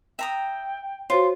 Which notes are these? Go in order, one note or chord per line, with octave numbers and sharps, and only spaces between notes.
E5 G5 A#5 D#6
F4 F#4 C5 C#5